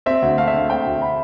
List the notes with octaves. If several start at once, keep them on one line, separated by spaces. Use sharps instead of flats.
C4 E5
D2
A3 F5
E5
D3 F5
C4 G5
D2
A3 B5